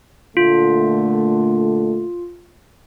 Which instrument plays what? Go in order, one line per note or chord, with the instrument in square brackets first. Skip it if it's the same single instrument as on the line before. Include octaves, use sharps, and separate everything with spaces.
[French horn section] A#2 D3 A3 [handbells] F4